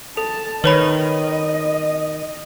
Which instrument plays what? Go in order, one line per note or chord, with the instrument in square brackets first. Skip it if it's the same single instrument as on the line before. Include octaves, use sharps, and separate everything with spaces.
[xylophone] A4 [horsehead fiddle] A5
[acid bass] D#3 [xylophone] B4 C#5 B5 [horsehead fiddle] D#5